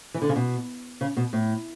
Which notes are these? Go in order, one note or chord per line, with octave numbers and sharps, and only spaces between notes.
E3
D3
C#3
B2
C#3
B2
A2